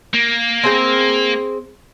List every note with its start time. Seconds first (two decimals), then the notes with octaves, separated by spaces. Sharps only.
0.14 A#3
0.64 C4 G#4 G5